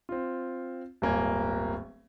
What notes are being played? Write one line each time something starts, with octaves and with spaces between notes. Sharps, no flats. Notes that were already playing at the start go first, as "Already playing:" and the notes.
C4 F4
D1 G1 A#3 G#5 G#6